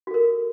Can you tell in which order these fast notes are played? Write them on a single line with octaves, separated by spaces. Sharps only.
F#4 A4 A#4